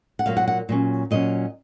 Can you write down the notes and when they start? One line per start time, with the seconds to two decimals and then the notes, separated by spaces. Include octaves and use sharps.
0.19 F#5
0.26 A#2 F#3 A#3 F5
0.37 F#5
0.48 F#5
0.69 A#2 F#3 C#4
1.11 A#2 F#3 C#4 D#5